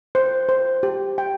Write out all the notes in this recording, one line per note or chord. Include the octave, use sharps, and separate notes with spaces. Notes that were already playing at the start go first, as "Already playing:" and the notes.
C5
C5
G4
G5